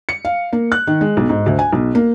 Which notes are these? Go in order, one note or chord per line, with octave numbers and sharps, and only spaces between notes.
C#7
F5
A#3
F#6
D#3
G#3
B1
G#2
D2
G#5
B1
A#3